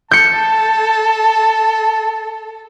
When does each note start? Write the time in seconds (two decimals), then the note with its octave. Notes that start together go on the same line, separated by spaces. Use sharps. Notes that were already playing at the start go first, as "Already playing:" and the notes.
0.11 A4 A5 G6 C#7